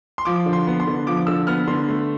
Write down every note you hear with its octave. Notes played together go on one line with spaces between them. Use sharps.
C6
F3 D6
D3
C6
B3
C6
D3
F3 D6
D3 E6
B3 F6
D3 C6
A3